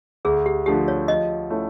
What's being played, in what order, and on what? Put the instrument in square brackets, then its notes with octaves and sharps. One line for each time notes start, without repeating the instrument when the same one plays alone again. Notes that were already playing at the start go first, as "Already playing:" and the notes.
[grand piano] D2 [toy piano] G#4
[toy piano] G4
[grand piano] D3 F3 A3 [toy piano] G4
[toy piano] C#5
[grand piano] F3 [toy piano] D#5
[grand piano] A3 C#4 E4